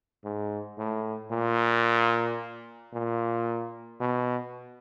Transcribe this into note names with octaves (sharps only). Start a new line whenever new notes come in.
G#2
A2
A#2
A#2
B2